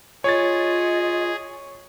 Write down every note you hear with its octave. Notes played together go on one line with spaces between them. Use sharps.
F4 G#4 C#5 D#5 A6